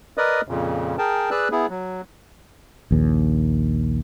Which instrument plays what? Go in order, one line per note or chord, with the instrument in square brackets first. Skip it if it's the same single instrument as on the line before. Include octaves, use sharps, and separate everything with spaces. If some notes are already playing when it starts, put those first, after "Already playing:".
[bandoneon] A#4 B4 D5 D#5 D#6
F2 A#2 C#3
G#4 A#4 G5 A5
G#4 B4 D5 E6 F#6
B3 E4 G#4
F#3
[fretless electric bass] A#1 D#2